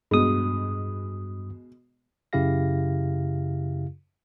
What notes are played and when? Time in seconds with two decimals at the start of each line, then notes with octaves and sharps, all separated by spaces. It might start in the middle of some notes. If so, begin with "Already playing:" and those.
0.11 G2 B2 G#3 D#6
2.33 F#2 C#3 E4 G4 F5 A#6